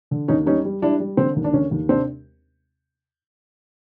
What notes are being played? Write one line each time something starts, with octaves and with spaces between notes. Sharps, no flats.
D3
D#2 C#4 D#4
G3 C#4 D#4
G3
G3 D4 E4
G3
D3 C4
D#2
D4
D3 C#4
D#2
C3 C4 D4